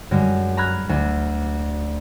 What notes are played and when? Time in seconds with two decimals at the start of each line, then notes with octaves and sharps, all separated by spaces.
0.11 F#2 D3 G3 G#3
0.57 A#5 B5 F6 F#6 G#6
0.89 D2